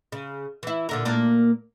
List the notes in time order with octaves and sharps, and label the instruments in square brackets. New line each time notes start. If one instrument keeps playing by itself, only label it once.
[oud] C#3
E3 E4
A#2 D3 A#4
A#2 A#3 D4